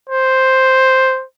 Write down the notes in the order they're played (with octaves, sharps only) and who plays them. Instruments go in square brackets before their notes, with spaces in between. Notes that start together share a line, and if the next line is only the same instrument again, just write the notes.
[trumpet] C5